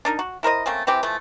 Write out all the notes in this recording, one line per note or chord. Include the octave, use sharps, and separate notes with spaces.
D4 D#4 A#4
F#4
E4 A#4 C5 D#5
A3 A#3 C4 C#4
C3 E3 C4 G4
E3 F3 A3